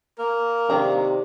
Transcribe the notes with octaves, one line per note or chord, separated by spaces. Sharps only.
A#3 A#4
C3 D#3 D4 A#5